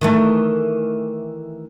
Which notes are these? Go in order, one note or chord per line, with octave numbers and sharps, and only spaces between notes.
D#3 E3 A3